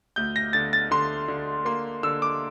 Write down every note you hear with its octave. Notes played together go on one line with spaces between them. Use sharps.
D2 G6
A#6
D3 A6
A6
D3 C6
D3
A#3 C6
D3 E6
D6